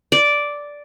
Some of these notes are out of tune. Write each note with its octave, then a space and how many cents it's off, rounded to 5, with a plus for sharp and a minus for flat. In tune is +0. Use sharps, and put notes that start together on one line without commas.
D5 -5